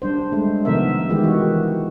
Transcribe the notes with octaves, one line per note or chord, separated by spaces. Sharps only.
G3 D4 C5
G#3 A3
C3 D#3 F3 B3 A#4 E5
D#3 E3 G#3 E4 G4
F#4